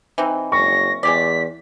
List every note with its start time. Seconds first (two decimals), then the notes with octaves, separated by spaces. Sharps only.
0.18 E3 C4 D#4
0.52 F#1 C#6 A#6
1.03 E2 G#3 G4 D5 B6